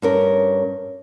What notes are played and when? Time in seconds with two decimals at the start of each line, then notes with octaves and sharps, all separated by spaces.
0.02 G2 C#4 A#4